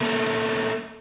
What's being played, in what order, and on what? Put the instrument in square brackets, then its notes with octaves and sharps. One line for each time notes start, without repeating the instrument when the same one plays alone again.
[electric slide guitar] A3 A#3 C#4 A4